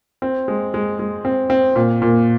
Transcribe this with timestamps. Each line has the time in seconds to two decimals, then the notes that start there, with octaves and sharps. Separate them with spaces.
0.22 C4
0.48 G#3
0.74 G#3
0.99 G#3
1.25 C4
1.50 C4
1.76 A#2
2.02 A#2